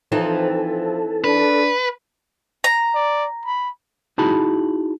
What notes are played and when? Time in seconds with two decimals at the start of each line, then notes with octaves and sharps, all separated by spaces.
0.12 E3 F3 C4 D#4 A4
0.52 F3
1.24 D4 B4
2.64 A#5
2.95 D5
3.46 B5
4.18 D#4 E4 F#4 G#4 A5 B5